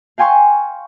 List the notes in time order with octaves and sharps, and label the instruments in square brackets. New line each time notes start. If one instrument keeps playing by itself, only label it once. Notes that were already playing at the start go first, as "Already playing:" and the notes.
[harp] F5 G5 G#5 C6 C#6